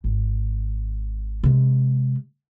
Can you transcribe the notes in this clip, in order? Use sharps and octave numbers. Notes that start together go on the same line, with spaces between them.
G#1
C3 G#3